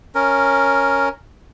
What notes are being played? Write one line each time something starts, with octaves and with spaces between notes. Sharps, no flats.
C#4 A#4